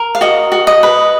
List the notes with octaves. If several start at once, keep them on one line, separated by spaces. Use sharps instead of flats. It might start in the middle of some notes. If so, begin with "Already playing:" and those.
Already playing: A#4
F5
F#4 D#5
F#4
D#5
B4